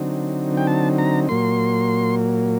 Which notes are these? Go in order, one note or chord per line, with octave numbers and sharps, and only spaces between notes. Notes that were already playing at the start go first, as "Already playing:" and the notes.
Already playing: D3 F#3 C4 D#4
G5
A5
A#5
A#2 F#3 A#3 C6